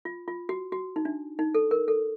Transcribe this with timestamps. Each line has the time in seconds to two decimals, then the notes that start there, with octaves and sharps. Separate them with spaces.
0.05 F4
0.28 F4
0.49 F#4
0.72 F#4
0.96 D#4
1.05 D4
1.39 D#4
1.55 A4
1.71 A#4
1.88 A4